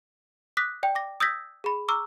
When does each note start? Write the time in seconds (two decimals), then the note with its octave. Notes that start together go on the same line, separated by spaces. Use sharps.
0.57 D6 D#6 F#6 A#6 B6
0.83 D5 G5
0.95 D6 A#6
1.20 D#6 E6 G6 G#6 A#6 B6
1.64 G#4 B5
1.88 A#5 C#6 D6 E6 F6